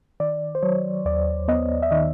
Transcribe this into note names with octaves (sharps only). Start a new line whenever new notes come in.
D#3 D5
C5
F#3 C#5
D#2 D5
B3 D#5
E5
D#3 D#5